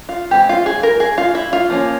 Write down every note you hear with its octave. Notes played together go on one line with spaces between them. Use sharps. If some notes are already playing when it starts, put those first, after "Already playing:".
F4
E3 G#3 C4 G4
F4
G#4
A#4
G#4
F4
E4
F4
F3 A#3 C#4